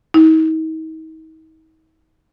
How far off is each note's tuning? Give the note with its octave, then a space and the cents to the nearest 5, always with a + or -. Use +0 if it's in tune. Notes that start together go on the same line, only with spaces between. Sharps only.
D#4 +40